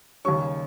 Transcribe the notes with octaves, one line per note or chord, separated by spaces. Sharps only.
D#2 C#3 G3 C#4 C#6